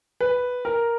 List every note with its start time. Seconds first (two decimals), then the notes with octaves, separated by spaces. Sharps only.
0.21 B4
0.65 A#4